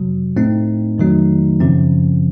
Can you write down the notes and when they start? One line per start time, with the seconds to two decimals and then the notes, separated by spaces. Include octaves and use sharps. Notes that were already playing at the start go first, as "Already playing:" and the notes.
Already playing: F2 C3 F#3
0.36 A2 A3 C4 D#4
0.98 F2 D#3 F#3 A3 D#4
1.60 F#2 C#3 F3 C4